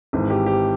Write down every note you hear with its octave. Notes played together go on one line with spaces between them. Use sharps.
G#1 G#2 E3
G4
G4